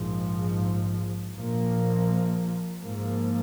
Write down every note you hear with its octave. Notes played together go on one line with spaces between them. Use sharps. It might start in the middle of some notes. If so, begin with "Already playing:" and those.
Already playing: A#1 G#2 F3
A#1 A#2 F3 A#3
G#2 F3 A#3